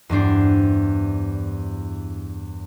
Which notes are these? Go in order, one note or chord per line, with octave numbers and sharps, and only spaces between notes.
E2 G2 D4 C5